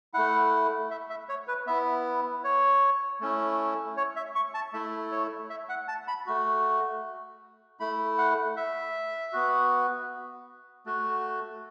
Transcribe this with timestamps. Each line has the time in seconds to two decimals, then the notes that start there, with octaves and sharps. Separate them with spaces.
0.14 A3 E4 F#5
0.91 E5
1.10 E5
1.29 C#5
1.48 B4
1.67 B3 E4 E5
2.44 C#5
3.20 A3 C#4 E4
3.97 C#5
4.16 E5
4.35 C#6
4.54 A5
4.73 A3 E4 E5
5.12 C#5
5.50 E5
5.69 F#5
5.88 A5
6.08 B5
6.26 A3 F#4
7.80 A3 E4 B5
8.18 F#5
8.57 E5
9.33 B3 F#4
10.86 A3 F#4